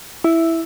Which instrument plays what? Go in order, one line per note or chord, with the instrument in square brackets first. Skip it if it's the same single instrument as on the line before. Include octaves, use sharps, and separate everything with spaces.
[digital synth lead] E4